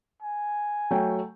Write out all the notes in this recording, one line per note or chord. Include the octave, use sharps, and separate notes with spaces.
G#5
F#3 A3 G5